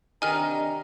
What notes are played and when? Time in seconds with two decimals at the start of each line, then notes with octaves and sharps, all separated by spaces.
0.22 C3 D#3 D4 D#4 G4 G#5 A#5 F6